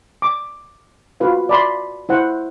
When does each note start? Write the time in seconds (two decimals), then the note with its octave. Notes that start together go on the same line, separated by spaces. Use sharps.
0.22 D6
1.20 F4 F#4 B4 F5
1.49 D5 B5 C6
2.09 E4 C5 F#5